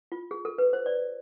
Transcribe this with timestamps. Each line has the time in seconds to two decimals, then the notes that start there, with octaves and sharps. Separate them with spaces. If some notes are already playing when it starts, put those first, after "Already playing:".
0.12 F4
0.31 G#4
0.45 A4
0.58 B4
0.73 C5
0.86 D5